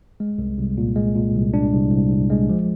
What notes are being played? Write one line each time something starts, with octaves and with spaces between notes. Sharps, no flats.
G#3
C2
C2
A#2
G#3
A#2
C2
D4
C2
C2
C2
G#3
F3